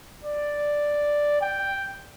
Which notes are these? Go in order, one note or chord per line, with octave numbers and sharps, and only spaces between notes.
D5
G5